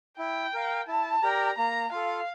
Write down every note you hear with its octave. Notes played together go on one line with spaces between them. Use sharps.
E4 G5
A#4 F5
E4 A5
G4 A#4 D5 G5 A#5
A#3 A#5
F4 A4 F5